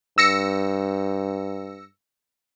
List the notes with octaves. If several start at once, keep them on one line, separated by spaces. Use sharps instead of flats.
G2 E6 A#6 C#7